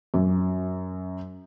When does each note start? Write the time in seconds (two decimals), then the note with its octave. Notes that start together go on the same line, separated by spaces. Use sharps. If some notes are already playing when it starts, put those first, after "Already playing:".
0.14 F#2